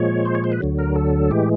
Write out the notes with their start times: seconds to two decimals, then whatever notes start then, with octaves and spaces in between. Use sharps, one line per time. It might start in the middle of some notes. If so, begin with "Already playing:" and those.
Already playing: A#2 F3 G#3 C#5
0.25 C5
0.35 C#5
0.44 C5
0.52 B4
0.61 D2 D3 F#3
0.79 A#4
0.96 A4
1.30 A2 E3 G#3 G4